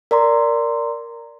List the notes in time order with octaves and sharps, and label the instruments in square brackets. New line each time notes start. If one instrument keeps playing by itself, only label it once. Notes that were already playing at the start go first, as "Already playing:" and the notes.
[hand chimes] A#4 D5 A#5 C6